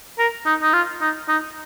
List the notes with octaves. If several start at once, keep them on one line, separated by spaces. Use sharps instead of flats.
A#4
D#4
D#4
F4
D#4
D#4